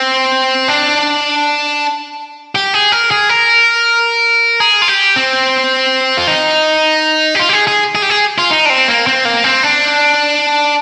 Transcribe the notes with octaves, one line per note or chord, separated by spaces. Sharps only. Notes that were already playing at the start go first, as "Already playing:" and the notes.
Already playing: C4
D4
G4
G#4
A#4
G#4
A#4
G#4
F4
G4
C4
F4
D#4
G4
F4
G4
G#4
G#4
G#4
G4
G#4
F4
D#4
D4
C4
A#3
C4
A#3
C4
D4